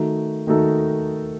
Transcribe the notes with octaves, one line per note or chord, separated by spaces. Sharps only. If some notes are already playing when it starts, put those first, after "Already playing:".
Already playing: D#3 A3 D#4 F#4 A4
D#3 A3 D#4 F#4 A4